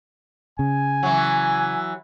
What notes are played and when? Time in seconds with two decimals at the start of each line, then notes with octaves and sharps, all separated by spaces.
0.59 C#3 G#5
1.03 E3 F#3